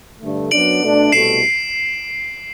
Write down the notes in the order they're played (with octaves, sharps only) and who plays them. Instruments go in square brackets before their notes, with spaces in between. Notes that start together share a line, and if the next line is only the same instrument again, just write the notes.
[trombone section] G2 D3 A3
[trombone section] F#2 F#3 B3 D4 [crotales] D7 F#7
[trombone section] B2 A3 D4
[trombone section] C2 B2 A3 [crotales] C7 E7